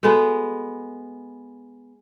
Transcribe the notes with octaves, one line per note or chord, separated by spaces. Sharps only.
G#3 B3 F#4 A4 G#5